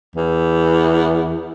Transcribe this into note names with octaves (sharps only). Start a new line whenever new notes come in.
E2